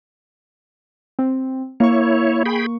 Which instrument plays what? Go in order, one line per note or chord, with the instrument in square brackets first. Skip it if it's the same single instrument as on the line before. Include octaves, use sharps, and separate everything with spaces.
[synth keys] C4
[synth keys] A#3 C#6 [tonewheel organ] E4 C#5
[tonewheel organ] G#4 G5 B5